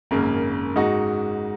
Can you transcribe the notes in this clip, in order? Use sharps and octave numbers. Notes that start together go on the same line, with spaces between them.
G#1 F#2 C#3 A#3
G#2 G#3 D#4 F#4